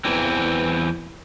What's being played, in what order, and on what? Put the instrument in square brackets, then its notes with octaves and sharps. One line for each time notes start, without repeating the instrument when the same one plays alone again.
[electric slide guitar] E2 E3 C4